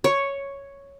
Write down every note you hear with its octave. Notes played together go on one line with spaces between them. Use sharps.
C#5